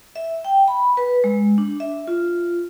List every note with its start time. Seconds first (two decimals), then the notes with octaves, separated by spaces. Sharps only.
0.16 E5
0.45 G5
0.68 B5
0.97 B4
1.24 G#3
1.58 D4
1.80 E5
2.08 F4